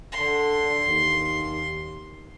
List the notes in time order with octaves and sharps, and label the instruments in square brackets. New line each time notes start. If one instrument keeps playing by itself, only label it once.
[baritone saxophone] D3 [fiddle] C6
[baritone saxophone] D#2